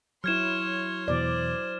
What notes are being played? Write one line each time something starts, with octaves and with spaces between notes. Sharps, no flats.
F#3 E4 C#5 C6 F6 G#6 E7
E2 B2 E3 C5 D5